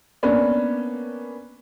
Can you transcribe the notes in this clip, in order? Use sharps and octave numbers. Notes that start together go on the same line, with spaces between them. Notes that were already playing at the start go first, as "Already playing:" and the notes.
A#3 B3 C#4 D4